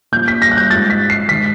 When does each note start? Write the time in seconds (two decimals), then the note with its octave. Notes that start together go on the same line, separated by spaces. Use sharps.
0.12 A#2 F3 G6
0.28 B6
0.42 A#6
0.51 F#6
0.57 G6
0.71 G#2 F3 A6
0.90 B6
1.10 C7
1.29 G#2 D#3 B6